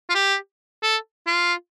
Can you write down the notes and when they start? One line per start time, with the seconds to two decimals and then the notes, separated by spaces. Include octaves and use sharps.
0.10 F4
0.15 G4
0.83 A4
1.27 F4